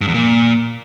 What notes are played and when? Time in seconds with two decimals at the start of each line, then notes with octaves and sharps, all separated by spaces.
0.01 G2
0.08 E2
0.14 A#2